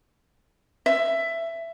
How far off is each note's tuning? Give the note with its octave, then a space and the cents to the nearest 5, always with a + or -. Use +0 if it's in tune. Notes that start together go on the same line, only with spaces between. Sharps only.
E5 +15